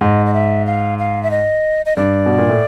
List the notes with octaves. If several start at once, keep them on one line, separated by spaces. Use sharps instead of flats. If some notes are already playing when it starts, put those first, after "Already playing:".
G#2 D#5
D#5
E5
F5
F5
E5
D#5
D#5
G2 D5
B2
A#2
A2